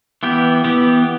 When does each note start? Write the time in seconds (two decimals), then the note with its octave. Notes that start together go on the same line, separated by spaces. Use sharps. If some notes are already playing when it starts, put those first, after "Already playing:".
0.23 E3 B3 G4
0.64 E3 B3 G4